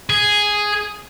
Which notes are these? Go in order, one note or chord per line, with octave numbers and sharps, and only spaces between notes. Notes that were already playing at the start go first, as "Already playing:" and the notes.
G#4